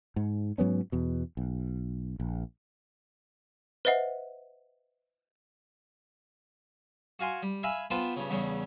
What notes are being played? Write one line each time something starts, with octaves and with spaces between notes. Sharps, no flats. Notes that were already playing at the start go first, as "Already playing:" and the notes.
G#2
G#2 F#3 B3 C#4
E2 B2
B1
A#1
B4 C5 D#5 E5 F#5
F#4 F5 G#5 C6
G3
E5 F5 G#5 B5
B3 F4 B4 C5 G5 A5
G2 C#3
E2 G2 C#3